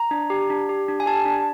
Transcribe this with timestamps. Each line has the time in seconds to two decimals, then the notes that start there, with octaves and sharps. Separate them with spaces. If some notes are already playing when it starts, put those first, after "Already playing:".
Already playing: A#5
0.11 D4
0.30 G4
0.50 D4
0.69 G4
0.88 D4
1.00 G#5
1.06 G4 A5
1.25 D4